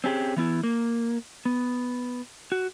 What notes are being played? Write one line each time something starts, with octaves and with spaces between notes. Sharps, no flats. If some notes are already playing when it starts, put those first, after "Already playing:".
C4 C#4 G4 G#4
E3 B3 E4
A#3
B3
F#4